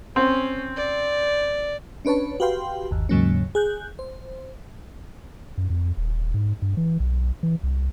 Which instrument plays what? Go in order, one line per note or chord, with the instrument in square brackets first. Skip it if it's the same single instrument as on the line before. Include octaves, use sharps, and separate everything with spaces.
[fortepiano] C4 [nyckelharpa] C#4
[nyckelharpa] D5
[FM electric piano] C#4 D4 B4 C#5 A5
F#4 G4 B4 F5 G5 C6
G1 D#2
D#2 G#2 C#3 F#3 A#3 C#4
G#4 F#6 G6
C5
[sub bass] F#2
F2
D#1
G#2
G2
E3
B1
E3
C2